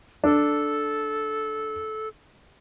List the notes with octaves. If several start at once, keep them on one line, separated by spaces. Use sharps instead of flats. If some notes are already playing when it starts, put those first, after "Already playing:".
D4 A4